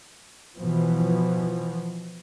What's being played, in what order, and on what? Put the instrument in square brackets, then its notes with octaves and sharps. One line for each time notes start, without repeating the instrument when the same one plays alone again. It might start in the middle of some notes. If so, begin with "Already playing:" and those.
[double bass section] B2 E3 F3